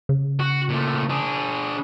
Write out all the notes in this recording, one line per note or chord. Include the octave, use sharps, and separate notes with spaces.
C#3
F#4
A#2 A3
D4 G#4